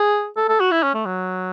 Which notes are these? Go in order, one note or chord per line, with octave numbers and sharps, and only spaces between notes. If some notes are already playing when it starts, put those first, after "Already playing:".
Already playing: G#4
A4
A4
F#4
E4
C#4
A3
F#3